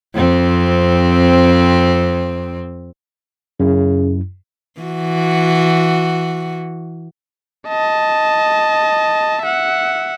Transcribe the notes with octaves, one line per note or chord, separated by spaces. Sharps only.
F2 C4
F#2 C#3 E4
E3 F#4
D#5 A5
E5 F#5